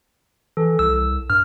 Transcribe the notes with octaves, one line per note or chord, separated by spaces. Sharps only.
E3 A4
C2 E6
G2 F6